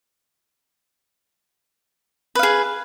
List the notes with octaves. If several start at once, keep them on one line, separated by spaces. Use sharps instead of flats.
G#4 B4 F5